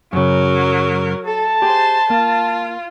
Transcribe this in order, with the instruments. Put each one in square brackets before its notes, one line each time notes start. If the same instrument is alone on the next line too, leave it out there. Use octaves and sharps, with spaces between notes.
[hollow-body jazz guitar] F#2 C#3 [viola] F#3 A#4
[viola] A4 [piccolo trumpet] A5
[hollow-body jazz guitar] G4 G#4 [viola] C5 C6
[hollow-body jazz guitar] A#3 [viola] F4